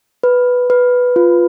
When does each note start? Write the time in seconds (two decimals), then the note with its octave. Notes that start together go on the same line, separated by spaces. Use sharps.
0.24 B4
0.70 B4
1.16 F4